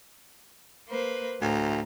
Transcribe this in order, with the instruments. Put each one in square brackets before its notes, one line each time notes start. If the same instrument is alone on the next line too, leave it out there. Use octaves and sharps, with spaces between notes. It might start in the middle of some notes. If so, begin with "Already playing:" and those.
[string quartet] A#3 B4 C5
[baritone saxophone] D2 [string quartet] A2 A#5